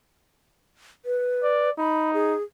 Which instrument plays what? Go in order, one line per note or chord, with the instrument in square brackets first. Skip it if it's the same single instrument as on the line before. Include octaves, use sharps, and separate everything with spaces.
[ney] B4
[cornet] D5
[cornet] D#4 [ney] B5
[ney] G#4